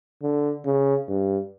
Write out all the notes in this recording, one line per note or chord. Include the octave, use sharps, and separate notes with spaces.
D3
C#3
G2